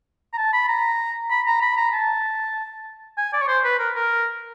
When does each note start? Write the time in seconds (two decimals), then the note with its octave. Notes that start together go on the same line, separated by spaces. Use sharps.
0.34 A#5
0.38 A5
0.53 B5
0.69 A#5
1.31 B5
1.47 A#5
1.62 B5
1.77 A#5
1.93 A5
3.18 G#5
3.33 D5
3.42 C#5
3.48 C5
3.64 B4
3.79 A#4
3.95 A#4